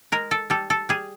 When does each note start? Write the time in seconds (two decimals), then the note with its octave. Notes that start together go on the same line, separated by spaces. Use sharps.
0.12 G#3 A#4
0.31 A4
0.50 G3 A4
0.70 A4
0.89 G3 G#4